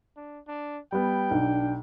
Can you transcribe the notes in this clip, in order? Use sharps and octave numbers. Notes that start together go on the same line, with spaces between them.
D4
D4
G3 B3 G5
B1 D4